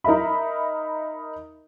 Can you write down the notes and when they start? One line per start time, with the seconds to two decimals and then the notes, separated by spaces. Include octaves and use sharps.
0.04 D#4 A#4 D#5 E5 B5